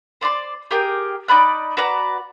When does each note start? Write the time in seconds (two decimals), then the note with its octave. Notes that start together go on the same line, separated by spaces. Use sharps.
0.21 C5 D5 A#5 C6
0.71 G4 G#4 A#4 G5
1.28 D#4 D5 B5 F#6
1.77 F#4 B4 D5 A#5